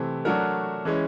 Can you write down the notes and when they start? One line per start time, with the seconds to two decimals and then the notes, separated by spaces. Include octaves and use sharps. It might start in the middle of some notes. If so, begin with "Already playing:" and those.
Already playing: C3 E3 A3 C4
0.25 F#3 A3 D4 F#4 A#4
0.85 E3 G#3 C#4